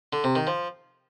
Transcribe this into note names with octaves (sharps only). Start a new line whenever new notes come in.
D3
C3
D#3
F3